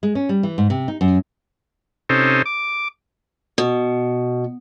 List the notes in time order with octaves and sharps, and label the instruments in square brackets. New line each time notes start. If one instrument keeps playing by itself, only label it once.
[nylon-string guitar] G#3
C#4
G3
E3
G#2
C3
D#4
F#2
[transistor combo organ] C3 C#4 D#4 A4 C5
D6
[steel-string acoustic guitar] B2